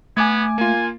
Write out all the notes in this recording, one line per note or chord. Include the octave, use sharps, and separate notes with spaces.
A3 B3 G#5 D6 G#6
A#3 F4 G#5